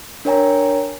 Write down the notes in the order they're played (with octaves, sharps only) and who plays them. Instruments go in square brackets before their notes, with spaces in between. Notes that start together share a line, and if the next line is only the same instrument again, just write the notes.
[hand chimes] D4 A#4 C#5 G5 G#5 A#5